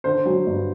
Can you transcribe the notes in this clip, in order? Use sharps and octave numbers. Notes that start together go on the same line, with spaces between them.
D3 C5
F#3
G2